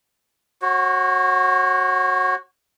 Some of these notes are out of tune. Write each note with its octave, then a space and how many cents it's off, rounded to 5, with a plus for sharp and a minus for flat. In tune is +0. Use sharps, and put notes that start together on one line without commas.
F#4 +0 C#5 -40